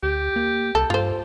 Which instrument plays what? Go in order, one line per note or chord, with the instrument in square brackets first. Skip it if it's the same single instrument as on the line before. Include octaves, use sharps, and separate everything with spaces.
[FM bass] D2 [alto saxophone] G4
[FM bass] A#3
[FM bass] C2 [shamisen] A4
[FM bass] G2 [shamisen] F4 C5